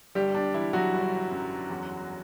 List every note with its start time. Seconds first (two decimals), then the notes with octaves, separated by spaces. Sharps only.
0.15 G1 G3 G4
0.34 D4
0.54 E3 E4
0.73 F#3 F#4
0.93 G1
1.31 F#2
1.70 E2